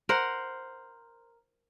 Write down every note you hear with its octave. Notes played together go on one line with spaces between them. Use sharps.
A#4 C5 F#5